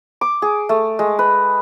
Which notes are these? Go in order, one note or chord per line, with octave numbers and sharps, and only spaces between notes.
D6
G#4
A3
G#3
B4